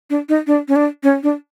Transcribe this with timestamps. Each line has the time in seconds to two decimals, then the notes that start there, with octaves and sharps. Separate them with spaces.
0.10 D4
0.29 D#4
0.47 D4
0.68 C#4
0.76 D4
1.03 C#4
1.23 D4